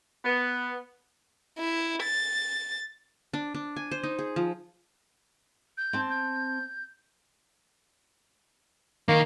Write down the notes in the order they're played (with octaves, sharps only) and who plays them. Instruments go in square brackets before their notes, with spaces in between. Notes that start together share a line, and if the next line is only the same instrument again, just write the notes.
[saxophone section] B3
[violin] E4
A6
[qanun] D4
D4
G#5
C5
D#4
G#4
F3
[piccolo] G6
[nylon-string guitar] C4 A5
[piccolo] G6
[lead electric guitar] D#3 [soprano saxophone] A#3